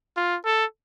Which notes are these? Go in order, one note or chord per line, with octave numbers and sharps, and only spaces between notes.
F4
A4